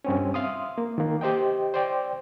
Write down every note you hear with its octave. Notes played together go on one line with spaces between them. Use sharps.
G2 C4 C#4
E5 F5 C6 D#6
A#3
D#3 A#3
G4 C5 D#5 G5
C5 D5 G5